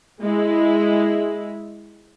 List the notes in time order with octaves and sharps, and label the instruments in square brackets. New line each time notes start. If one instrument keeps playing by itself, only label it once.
[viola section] G#3 E4